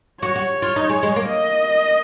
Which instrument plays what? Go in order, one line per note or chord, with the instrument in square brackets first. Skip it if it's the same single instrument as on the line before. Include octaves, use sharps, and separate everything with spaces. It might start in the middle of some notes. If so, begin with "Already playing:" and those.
[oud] F#4 [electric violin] C#5
[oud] F#4
F4
D#4
G#3
G#3
A#3
[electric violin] D#5